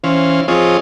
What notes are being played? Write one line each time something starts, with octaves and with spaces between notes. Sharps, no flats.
E3 C#4 C5 F5
F3 C4 F4 G#4 C#5 D#5